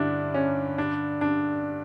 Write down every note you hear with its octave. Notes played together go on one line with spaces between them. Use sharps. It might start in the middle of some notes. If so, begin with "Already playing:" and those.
Already playing: G2 D3 D4 E4
C#4
D4
D4